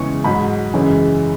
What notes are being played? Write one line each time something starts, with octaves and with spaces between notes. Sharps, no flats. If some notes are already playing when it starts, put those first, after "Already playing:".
Already playing: E2 C#3 E3 G#3 C#6
G#2 F#3 B5
F#2 C#3 E3 G#3